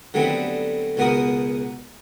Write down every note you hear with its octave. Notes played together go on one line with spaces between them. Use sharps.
D3 F#3 G3 A3 B3 C4
C#2 B2 B3 F#4 A#4 D#6